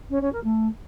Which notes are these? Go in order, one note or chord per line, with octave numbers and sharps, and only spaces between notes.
C#4
C#4
A#4
A3